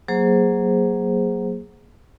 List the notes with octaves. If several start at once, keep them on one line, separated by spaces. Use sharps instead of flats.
F#3 A#3 G#4 C5